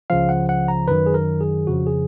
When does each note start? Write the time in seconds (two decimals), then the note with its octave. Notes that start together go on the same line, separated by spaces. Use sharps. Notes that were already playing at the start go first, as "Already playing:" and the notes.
0.10 C#2 C#3 F3 F5
0.29 F#5
0.49 F#5
0.68 A#5
0.88 F#2 D#3 F#3 B4
1.06 G#4
1.14 A#4
1.41 G#4
1.67 F2 C#3 F3 F#4
1.87 G#4